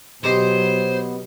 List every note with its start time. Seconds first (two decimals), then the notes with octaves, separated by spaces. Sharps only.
0.24 B2 F#3 B3 D#4 G4 C5 A#5